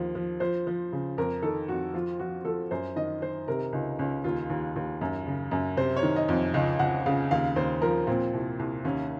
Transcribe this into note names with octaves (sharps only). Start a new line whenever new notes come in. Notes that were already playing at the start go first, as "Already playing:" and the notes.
Already playing: D#2 F3
F3
F3 C5
F3
C#3
F2 A#4
D#3 A4
F2 F#4
F3 F4
F3 F#4
F3 A4
F#2 C5
D#3 D#5
D#3 C5
C3 A#4
C#2 D#4
C#2 C#4
D#2 F4
D#2
D#2
F#2
C#3
F#2
C3 C5
C#5
D#3
D#5
F2
C#2 D#5
C#2 F#5
C#3 F5
D#2 F5
D#2 C5
F3 A#4
A#2 C4
C2
C2
D#2 C#4